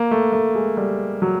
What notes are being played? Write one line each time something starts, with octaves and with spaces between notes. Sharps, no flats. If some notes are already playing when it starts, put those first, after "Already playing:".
Already playing: A#3
A3
A3
G#3
G3
F#3